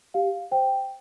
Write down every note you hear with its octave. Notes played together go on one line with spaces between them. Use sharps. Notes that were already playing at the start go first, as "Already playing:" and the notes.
G4 F5
C5 G5